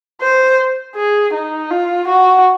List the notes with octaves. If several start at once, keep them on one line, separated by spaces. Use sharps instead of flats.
C5
G#4
D#4
F4
F#4